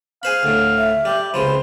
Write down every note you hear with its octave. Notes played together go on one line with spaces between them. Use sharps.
G#4 C5 F5 B5
D2 A2
E5
G3 G4
C#2 C3 F3 C5 B5